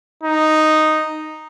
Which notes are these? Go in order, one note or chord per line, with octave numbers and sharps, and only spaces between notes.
D#4